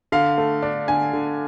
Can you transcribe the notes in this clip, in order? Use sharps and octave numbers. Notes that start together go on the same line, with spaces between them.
D3 F5
A3
D4
D3 G#5
D3